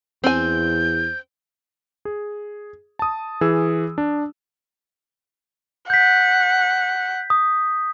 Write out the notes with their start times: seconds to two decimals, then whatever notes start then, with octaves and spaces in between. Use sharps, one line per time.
0.24 E2 C4 G#5 G6
2.05 G#4
2.99 A5 D#6
3.41 E3 G#4 E6
3.98 D4
5.90 F#5 G6 B6
7.30 D#6